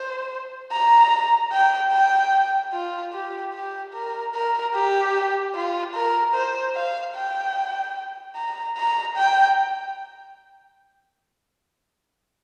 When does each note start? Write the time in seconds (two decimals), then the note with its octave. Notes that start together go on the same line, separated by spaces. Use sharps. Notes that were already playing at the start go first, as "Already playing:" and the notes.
Already playing: C5
0.72 A#5
1.52 G5
1.92 G5
2.73 F4
3.13 G4
3.54 G4
3.94 A#4
4.34 A#4
4.74 G4
5.55 F4
5.95 A#4
6.35 C5
6.75 F5
7.15 G5
8.36 A#5
8.77 A#5
9.17 G5